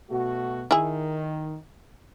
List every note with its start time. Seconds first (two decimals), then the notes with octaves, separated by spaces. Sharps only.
0.10 B2 A3 F#4
0.71 D#3 E4 G#4